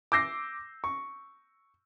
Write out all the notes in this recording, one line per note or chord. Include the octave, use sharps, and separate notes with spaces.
D6 E6 G6 A#6 C7
C#6